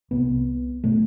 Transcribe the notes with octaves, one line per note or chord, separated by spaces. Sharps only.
C2 C3 B3
B2 A3